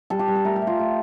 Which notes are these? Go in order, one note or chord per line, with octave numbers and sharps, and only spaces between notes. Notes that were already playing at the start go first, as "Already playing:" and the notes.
G3 A4
G4
G3
A4
A3 A#4
G4
A3
F4
A3